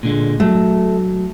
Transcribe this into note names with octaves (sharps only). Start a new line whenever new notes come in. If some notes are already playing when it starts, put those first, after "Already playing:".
A#2 D3 G#3
F#3 A3